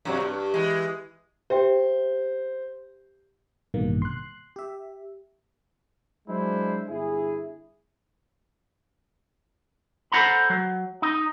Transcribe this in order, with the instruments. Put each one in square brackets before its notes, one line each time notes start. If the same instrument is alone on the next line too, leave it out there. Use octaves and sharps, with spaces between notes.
[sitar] G2 C3 F#3
G2
E3 G#3
[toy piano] G4 E5 G5 [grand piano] C5
[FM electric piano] A1 G2 B2 D#3 A#3
C6 F#6
G4 E5
[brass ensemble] F#3 G#3 D4 E4 C5
G1 E4 G#4
[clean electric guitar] A4 C5 C#5 F#5 A#5 B5
F#3
D#4